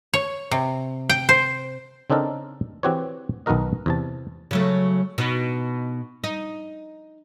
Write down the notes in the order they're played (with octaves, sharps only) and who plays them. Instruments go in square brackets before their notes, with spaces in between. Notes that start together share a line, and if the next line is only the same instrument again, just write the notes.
[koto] C#5
C3
G5
C5
[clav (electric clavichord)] C#3 C4 D4 D#4 A4 A#4
E3 C4 F#4 G4 C5 C#5
B1 D#3 B3 F#4 A#4 D#5
E2 C3 A5
[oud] C#3 F#3 A3
B2 D#4
D#4